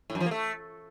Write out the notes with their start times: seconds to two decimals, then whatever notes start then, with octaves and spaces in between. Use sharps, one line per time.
0.10 A2
0.15 F#2
0.20 F3
0.26 A#3
0.31 A3